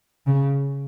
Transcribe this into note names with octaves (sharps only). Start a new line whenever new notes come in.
C#3